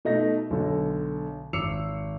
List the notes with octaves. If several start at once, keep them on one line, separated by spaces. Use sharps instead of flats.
B2 A3 D#4 E5 A#6
B1 D3
G#1 D6 E6 C7 C#7 F7